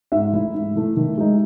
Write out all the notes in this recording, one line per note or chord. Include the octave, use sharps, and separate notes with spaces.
G#2 E5
E3 A3 E4
G#2
E3 A3 E4
D#3
G#3 D#4